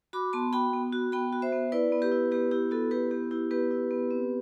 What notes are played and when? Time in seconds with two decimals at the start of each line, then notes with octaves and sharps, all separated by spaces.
0.13 F#4 B5 D6
0.33 B3 A5 C6
0.53 F#4 G5 B5
0.73 B3
0.92 F#4
1.12 B3 G5 B5
1.33 F#4
1.42 C5 E5
1.52 B3
1.72 E4 B4 D5
1.92 B3
2.02 G4 B4
2.12 E4
2.32 B3 G4 B4
2.51 E4 G4
2.71 B3 F#4 A4
2.91 E4 G4 B4
3.11 B3 G4
3.31 E4 G4
3.51 B3 G4 B4
3.71 E4
3.91 B3
4.11 C4